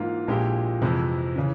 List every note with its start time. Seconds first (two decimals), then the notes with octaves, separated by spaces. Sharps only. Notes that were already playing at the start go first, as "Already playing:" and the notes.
Already playing: G#2 E3 A#3 F4
0.28 A#1 A#2 G#3 E4 G4
0.82 F2 C3 E3 G#3 E4
1.36 C#3 E3